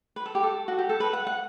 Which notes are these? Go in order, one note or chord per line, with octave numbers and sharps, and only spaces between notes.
B4
A4
G4
A4
F#4
G4
A4
B4
F#5
F#5